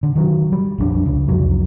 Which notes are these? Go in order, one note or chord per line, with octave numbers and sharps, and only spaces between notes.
D3
D#3 F#3
G3
A#1 F2 C4 D4
C#2 C#3
C2 F2 G#2 F#3